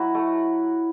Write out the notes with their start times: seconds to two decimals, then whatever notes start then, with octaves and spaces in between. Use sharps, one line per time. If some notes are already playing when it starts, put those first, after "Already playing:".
Already playing: F#3 E4 F#4
0.15 A3